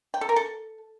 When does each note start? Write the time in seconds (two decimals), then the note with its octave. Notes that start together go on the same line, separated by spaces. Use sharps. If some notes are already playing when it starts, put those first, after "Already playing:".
0.14 G5
0.21 A4
0.29 A#4
0.36 A4